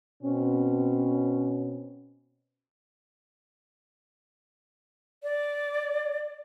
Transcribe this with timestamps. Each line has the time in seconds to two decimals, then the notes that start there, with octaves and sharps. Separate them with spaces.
0.23 B2 C4 C#4
5.23 D5